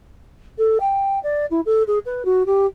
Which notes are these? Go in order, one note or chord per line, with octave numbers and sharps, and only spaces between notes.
A4
G5
D5
E4
A4
G#4
B4
F#4
G4